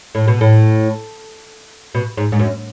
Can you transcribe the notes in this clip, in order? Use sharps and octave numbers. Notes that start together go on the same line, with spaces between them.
A2
B2
A2
B2
G#2
G#2
F#2